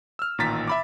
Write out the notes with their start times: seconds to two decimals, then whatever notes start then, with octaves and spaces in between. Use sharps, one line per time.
0.19 E6 F6
0.38 A1 A#2 D#3 A#5 A6 B6
0.67 E5 B5 D6